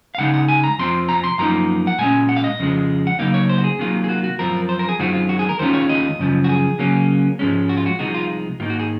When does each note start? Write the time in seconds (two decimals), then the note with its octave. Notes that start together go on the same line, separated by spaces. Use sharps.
0.15 F5
0.18 C#2 C#3 G#3 D#4 F#5
0.34 F#5
0.48 G#5
0.64 A#5
0.79 F2 C3 F3 C4 C6
1.09 A#5
1.24 C6
1.39 F#2 F3 A#3 D#4 A#5
1.87 F#5
1.98 A#2 G#3 C#4 G#5
2.29 F#5
2.36 F5
2.44 D#5
2.59 F2 C#3 F3 G#3
3.07 F#5
3.19 C#3 F#3 A#3 D#4 F5
3.34 C#5
3.49 C5
3.58 F#4
3.64 G#4
3.79 C3 D#3 F#3 A#3 F4
4.04 G#4
4.09 F#4
4.24 F#4
4.39 F#2 F3 C4 F4 A#4
4.69 C5
4.79 A#4
4.89 G#4
4.99 F#2 D#3 G#3 C4 F4 F#4
5.14 F4
5.29 F#4
5.39 G#4
5.49 A#4
5.59 D#2 D#3 G#3 C#4 F4 C5
5.74 C#5
5.89 D#5
6.19 F#2 C#3 F3
6.44 F#4
6.49 G#4
6.79 C#3 F#3 A#3 C#4
7.39 G#2 F3 G#3 C#4
7.69 F#4
7.77 F4
7.86 F#4
7.99 C2 C3 F3 G#3 D#4 F#4
8.14 F4
8.60 G#2 D#3 A#3 D#4 F4
8.70 F#4
8.79 G#4